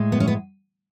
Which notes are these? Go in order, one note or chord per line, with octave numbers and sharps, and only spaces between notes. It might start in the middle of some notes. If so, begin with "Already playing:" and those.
Already playing: A2 G#3
B3
C#4
B3